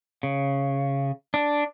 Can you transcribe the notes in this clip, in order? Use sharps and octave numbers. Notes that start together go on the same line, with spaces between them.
C#3
D4